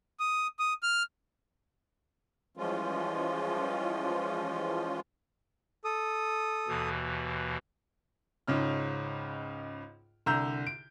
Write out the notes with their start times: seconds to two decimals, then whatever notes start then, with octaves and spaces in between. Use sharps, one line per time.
0.20 D#6
0.59 D#6
0.83 F6
2.57 E3 F3 G3 G#3 C#4 F4
5.84 A4 D#6
6.68 D#2 B2 E3
8.47 C#2 G#2 C#3 F6
10.26 C2 D3 A#5 E6 G6
10.67 D7